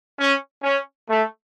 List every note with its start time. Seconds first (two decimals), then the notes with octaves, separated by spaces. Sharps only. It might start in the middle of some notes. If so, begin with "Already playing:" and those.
0.18 C#4
0.63 C#4
1.09 A3